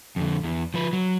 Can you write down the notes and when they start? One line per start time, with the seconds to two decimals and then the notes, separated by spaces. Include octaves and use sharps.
0.16 F2 D3
0.43 E2
0.74 F3 B4
0.93 F#3